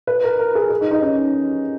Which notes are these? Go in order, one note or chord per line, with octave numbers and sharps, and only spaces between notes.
B4
A#4
A#4
G#4
G#4
D#4
D#4
C#4